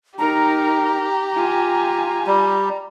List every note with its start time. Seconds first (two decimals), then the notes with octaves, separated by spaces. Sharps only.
0.18 D#4 G4 A#4 A#5
1.36 F4 G#5
2.27 G3